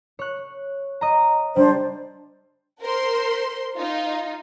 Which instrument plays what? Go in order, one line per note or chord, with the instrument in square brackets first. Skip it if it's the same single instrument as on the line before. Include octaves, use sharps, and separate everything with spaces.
[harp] C#5 F#6
D#5 A#5
[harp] G3 [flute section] D4 C5
[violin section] A#4 C5 C6
D#4 F4